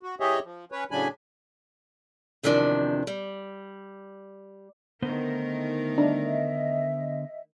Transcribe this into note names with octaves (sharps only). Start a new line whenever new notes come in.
F#4
E3 G4 G#4 C#5 D#5 E5
F3
C#4 B4 C#5
A2 C#3 F#3 D4 G#5 B5
E2 C3 D#3 F3 D4 A5
G3
D3 D#3 A3 B3 A#4 C5
D4 D#5 E5